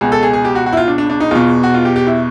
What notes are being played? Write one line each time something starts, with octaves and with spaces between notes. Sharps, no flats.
C#2 B2 G#4
A4
G#4
G#4
G4
F#4
F#4
E4
F4
D4
D4
D4
D#4
E2 B2 F4
F#4
F4
G4
G4
E4